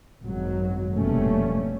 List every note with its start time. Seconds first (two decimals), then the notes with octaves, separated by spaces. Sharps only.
0.23 G#1 F#2 F#3
0.95 F1 B2 G3 A3 A#3 C#4